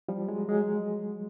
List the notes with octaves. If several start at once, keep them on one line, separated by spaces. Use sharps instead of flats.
F3 G3
F#3 G#3
F#3 G#3